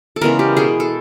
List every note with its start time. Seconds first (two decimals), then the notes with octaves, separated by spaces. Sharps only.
0.16 A4
0.21 C#3 E3 G#3 B3 A#4
0.39 G4
0.57 B2 G#3 B3 G#4
0.80 A4